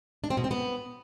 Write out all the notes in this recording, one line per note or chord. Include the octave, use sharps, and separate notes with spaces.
D4
C4
B2
C4
B3